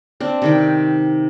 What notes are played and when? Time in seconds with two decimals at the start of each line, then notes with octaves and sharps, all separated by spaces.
0.20 C4 D4
0.42 C3 D#3 G5